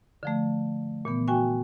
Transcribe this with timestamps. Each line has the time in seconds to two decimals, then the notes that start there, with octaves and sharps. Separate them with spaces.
0.23 D3 F3 A3
1.05 A#2 E3 B3
1.28 F#4 E5 G5 G#5 C#6